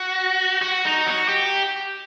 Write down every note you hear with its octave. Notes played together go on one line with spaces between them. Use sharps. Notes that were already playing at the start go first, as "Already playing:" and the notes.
Already playing: F#4
F#4
D#4
F#4
G4